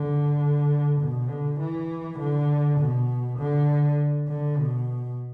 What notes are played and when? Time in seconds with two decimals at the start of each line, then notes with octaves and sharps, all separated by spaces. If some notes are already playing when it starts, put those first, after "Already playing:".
Already playing: D3
1.00 B2
1.29 D3
1.60 E3
2.19 D3
2.79 B2
3.38 D3
4.28 D3
4.57 B2